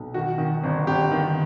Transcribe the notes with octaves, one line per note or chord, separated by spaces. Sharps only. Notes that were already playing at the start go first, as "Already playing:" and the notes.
Already playing: B1
D#3 F#4
D#3
G1
G1 G4
D#3